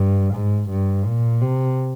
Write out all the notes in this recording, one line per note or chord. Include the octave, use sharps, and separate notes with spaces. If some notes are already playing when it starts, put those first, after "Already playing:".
Already playing: G2
G#2
G2
A#2
C3